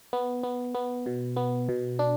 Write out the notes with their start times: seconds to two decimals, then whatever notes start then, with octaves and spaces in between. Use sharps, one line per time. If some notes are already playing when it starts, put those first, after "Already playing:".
0.13 B3
0.43 B3
0.75 B3
1.06 B2
1.36 B3
1.69 B2
1.99 D4